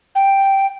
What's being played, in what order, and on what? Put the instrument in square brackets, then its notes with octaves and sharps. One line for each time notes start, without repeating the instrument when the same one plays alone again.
[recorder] G5